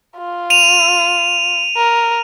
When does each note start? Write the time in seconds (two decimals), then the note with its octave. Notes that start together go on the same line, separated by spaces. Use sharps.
0.17 F4
0.50 D#7 F7
1.77 A#4